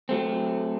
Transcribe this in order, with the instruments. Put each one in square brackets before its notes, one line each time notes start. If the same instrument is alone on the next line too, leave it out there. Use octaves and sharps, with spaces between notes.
[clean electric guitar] F#3 A3 C4